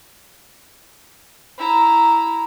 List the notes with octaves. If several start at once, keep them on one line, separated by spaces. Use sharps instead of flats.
E4 A#5